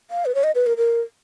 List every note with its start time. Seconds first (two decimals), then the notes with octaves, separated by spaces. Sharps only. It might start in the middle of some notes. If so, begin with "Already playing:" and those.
0.11 F5
0.26 B4
0.35 C#5
0.44 D#5
0.55 B4
0.66 A#4
0.77 A#4